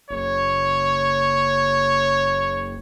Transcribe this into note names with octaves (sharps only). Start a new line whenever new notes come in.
F#1 C#5